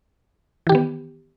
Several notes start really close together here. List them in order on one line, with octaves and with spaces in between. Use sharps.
E3 G4 D#3 B3